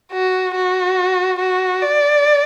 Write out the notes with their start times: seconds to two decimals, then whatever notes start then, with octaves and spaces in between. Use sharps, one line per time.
0.12 F#4
0.55 F#4
1.39 F#4
1.82 D5